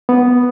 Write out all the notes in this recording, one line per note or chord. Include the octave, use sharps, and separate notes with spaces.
B3